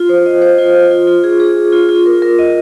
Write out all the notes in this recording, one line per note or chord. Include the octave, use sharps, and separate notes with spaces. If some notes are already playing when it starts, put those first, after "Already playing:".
Already playing: F4
C5
D#5
C5
F4
F4
F4
F4
G#4
G#4
G#4
F4
F4
A#4
A#4
D#5